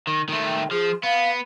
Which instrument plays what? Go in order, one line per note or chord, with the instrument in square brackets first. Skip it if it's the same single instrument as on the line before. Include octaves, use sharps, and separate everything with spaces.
[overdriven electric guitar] D#3
D#3 A3
[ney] G5
[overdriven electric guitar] F3 [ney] G#4
[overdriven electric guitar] B3 [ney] F5